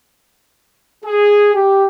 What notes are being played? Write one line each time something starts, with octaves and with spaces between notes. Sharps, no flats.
G#4
G4